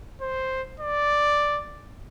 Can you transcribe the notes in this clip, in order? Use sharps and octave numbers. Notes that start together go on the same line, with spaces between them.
C5
D5